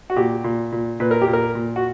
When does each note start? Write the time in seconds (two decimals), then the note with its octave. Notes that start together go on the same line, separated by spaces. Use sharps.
0.10 F#4
0.16 A#2 G4
0.44 A#2
0.72 A#2
1.00 A#2 B4
1.11 A#4
1.21 G4
1.27 A#2
1.33 A#4
1.55 A#2
1.76 F#4